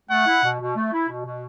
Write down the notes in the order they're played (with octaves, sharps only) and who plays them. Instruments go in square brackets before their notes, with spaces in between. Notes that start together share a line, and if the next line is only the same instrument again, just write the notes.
[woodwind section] A3 [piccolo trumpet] F#5
[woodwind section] E4
B2
B2
A3
E4
B2
B2